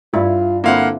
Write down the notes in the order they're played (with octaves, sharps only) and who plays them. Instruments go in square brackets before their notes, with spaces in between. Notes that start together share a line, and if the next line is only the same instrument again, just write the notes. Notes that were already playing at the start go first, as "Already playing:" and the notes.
[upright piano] G2 [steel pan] E4 [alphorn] F4
[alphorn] D3 [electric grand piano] A#3 F5 F#5 [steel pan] C4 E4 F4